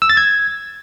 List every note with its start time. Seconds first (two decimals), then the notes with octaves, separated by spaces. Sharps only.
0.02 E6
0.10 A6
0.17 G#6